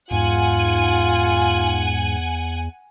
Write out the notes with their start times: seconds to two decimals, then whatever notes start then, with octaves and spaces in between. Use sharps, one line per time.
0.11 E2 G#2 F4 F#5 G#5